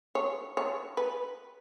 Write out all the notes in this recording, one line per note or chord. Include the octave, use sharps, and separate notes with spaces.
C#5
C#5
B4